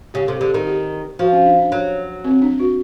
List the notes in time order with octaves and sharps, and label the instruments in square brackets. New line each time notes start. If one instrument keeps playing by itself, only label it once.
[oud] C#3 [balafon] G4
[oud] C3 [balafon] A4
[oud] D3 [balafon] G#4
[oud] D#3 [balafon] G#4
[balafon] G4
[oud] F3 [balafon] F#4
[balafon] C#4
D4
D4
[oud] F#3
[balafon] C4
D4
F#4